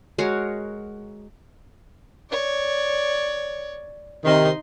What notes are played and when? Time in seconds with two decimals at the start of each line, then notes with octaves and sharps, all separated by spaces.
0.18 G#3 F#4 A#4 C#5
2.29 C#5 D5
4.25 C3 D#3 D#4 C6